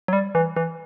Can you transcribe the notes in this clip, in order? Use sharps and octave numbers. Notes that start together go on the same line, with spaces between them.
F#3
G3
E3
E3